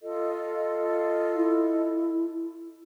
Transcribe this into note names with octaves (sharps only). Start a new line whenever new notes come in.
F4 A4 D#5
E4